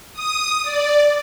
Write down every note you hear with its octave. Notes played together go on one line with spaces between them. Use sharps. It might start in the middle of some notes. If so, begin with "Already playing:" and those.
D#6
D5